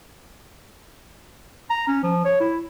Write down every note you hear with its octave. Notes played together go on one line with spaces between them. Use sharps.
A#5
C#4
F3
C#5
E4